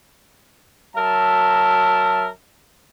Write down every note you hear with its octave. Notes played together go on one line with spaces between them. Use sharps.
F#3 A#4 E5 A5